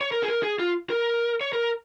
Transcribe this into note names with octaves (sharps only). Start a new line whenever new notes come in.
C#5
A#4
G#4
A#4
G#4
F4
A#4
C#5
A#4